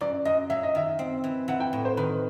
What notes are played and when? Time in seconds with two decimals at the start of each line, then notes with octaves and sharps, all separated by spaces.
0.01 F#2 D5
0.25 F#2 D#5
0.50 F#3 E5
0.63 D#5
0.75 D#3 E5
0.99 C4
1.24 E3
1.48 E3 F#5
1.60 G5
1.73 A2
1.85 C5
1.97 D#3 B4